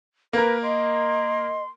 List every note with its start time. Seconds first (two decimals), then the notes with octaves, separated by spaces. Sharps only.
0.33 A#3 A#4 B4
0.63 D#5 C6